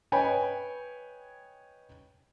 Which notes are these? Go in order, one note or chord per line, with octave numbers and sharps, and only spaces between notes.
B4 C#5 D#5 G5 G#5 B5